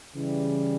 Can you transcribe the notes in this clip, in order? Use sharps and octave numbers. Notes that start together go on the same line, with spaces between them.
C#3 E3 G3